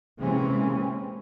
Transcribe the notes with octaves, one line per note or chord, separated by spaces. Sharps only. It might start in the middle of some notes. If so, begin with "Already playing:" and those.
C3 E3 G#3 A#3 C4 C#4